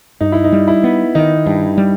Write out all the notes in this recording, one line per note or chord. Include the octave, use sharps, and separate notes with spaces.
G2 D#4
E4
D#4
G3
E4
B3
D#3 D#4
G2
G3